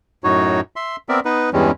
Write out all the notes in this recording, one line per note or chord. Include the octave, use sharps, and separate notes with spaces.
F#2 A2 D#4 F#4 C#5
E5 C6
B3 C4 A#4 D5 E5
B3 D#4 B4
E2 G2 E3 G3 G#3 C#4